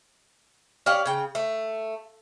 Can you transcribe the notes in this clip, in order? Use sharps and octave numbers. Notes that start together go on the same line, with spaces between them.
C#4 G4 D5 F5
C#3 G5
A3